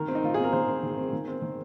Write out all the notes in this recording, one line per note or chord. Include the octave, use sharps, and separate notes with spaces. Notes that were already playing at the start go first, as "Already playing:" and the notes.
Already playing: D#3 A#4
C4
D#4
D#3 F4
C4 G#4
A#4
D#3 C5
C4
D#3
C4
D#3
C4
D#3